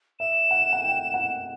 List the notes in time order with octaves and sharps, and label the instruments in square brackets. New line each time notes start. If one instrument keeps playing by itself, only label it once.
[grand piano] E5 [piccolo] E7
[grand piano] F#5
F#5
G5
F#5